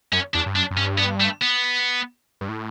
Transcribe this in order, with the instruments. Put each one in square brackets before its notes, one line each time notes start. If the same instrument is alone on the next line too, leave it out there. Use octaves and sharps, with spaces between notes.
[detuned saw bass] F#2 [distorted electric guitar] C#4
[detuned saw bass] E2 [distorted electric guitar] D4
[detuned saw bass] G2
[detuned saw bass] F#2 [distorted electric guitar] D4
[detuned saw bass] F#2
[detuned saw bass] G2 [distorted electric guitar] C#4
[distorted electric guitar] B3
A3
B3
[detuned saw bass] G2
A2